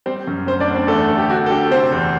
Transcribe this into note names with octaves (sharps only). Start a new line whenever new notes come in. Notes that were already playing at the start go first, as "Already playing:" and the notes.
G3 C4 C5
F#2
D2 C4 C5
D4 D5
D2
C4 C5
E2 A3 A4
D3
G4
D3 F#4
A4
D2 G4
C3 C4 C5
E2